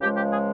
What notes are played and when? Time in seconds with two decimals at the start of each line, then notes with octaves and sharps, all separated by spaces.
0.01 C#2 C#3 F3 G#3 G4
0.17 G4
0.32 G#4